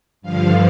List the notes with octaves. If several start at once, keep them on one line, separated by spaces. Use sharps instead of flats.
G2 D3 F3 F5